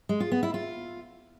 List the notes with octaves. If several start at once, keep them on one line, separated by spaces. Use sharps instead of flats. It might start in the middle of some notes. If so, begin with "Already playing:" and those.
G#3
F4
B3
E4
F4